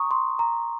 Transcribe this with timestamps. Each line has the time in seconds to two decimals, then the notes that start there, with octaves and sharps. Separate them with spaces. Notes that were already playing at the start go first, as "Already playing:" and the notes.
Already playing: A#5 C#6 D#6
0.11 C6
0.39 A#5